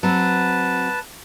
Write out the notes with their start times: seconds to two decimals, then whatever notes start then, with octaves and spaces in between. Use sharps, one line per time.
0.03 F#3 C4 B4 A5